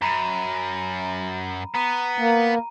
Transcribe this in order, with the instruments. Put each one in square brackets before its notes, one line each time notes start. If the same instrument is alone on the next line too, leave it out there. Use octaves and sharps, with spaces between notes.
[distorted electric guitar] F#2 [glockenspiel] A#5 B5 D#7
[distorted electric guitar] B3 [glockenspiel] A#5 D#7
[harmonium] A#3